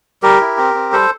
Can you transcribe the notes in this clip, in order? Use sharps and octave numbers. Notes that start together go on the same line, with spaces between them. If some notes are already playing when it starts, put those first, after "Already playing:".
G3 G4 A#4
E4
C4
C4
G3 A4 C5